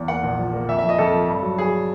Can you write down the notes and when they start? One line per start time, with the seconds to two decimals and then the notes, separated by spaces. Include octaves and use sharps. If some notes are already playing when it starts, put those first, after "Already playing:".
Already playing: E2
0.08 A#3 F#5
0.23 A#1
0.39 F3
0.53 A#3
0.68 F2 E5
0.79 E5
0.84 F3 D#5
0.98 F2 A4
1.13 F3
1.28 G2
1.43 F#3
1.58 F#3 G#4